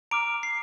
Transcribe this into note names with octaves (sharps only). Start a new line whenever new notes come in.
A#5 D6 F6 D7
C7